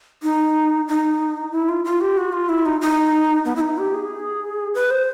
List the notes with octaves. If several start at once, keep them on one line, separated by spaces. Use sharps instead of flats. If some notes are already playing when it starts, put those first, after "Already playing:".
D#4
D#4
E4
F4
F4
G4
F#4
F4
E4
D#4
D#4
B3
E4
D#4
G4
G#4
B4
C5